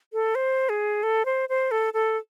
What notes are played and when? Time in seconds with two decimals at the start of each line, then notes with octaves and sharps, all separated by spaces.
0.13 A4
0.35 C5
0.69 G#4
1.03 A4
1.25 C5
1.49 C5
1.71 A4
1.94 A4